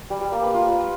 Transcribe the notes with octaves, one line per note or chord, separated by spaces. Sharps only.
G3
G3
A#3
B4
F4